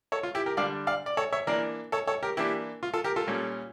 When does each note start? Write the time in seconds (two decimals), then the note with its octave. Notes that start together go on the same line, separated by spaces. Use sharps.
0.12 A4 C#5
0.23 F4
0.35 E4 G4
0.46 G4 A#4
0.57 D3 G3 D4 D5 F5
0.87 D5 F5
1.06 D5
1.17 A4 C#5
1.32 C#5 E5
1.47 E3 A#3 D4 A#4 D5
1.92 A4 C#5
2.07 A4 C#5
2.23 G4 A#4
2.37 E3 A#3 D4 E4 G4
2.83 F4
2.94 F4 A4
3.04 G4 A#4
3.16 F4 A4
3.27 A#2 G3 C#4